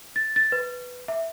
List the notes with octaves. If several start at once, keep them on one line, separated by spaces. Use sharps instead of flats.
A6
A6
B4
E5